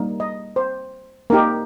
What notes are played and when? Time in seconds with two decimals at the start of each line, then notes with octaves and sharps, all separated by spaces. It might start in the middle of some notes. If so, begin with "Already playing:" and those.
Already playing: G3 A#3 D#4
0.20 D#5
0.56 C5
1.30 A#3 D#4 G4 A#4